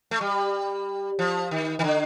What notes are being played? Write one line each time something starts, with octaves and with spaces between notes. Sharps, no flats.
A3
G3
F3
D#3
D#3
D3